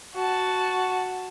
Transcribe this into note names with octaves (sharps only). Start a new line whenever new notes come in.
F#4 A5